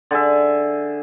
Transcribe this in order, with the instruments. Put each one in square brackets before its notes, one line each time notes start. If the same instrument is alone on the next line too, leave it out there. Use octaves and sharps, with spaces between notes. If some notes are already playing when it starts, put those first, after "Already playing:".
[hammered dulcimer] D3 G#4 E5